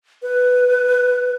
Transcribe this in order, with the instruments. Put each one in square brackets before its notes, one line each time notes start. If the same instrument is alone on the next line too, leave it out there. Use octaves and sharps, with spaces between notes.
[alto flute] B4